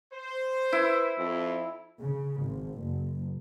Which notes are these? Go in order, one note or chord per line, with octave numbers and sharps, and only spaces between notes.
C5
E4 B4
F2
C#3
G#1
F#1